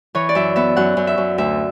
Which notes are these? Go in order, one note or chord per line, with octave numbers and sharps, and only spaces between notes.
E3 C#5
D5
F#2 E5
B3 E5
F#2 F#5
F#2
E5
F#2
D2 E5